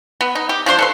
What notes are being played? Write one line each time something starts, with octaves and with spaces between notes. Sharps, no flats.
B3
D#4
G4
F3 D4 C5 C6
A4 B4 C6